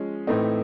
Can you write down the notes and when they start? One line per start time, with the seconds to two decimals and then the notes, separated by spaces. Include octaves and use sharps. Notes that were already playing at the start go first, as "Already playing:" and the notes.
Already playing: F3 G#3 C#4
0.27 A2 E3 A3 C4 D#4